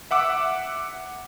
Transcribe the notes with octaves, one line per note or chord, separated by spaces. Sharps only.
E5 F#5 D6 E6